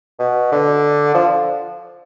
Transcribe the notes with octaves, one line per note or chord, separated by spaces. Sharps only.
B2
D3
F3